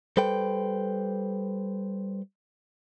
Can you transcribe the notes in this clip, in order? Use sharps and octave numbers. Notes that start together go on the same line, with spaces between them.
G3 A4 B4 C5 G5